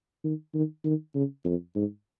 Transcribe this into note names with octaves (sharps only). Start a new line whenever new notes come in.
D#3
D#3
D#3
C#3
F2
G#2